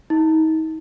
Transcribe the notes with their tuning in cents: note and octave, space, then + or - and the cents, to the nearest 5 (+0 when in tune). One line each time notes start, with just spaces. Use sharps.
D#4 +35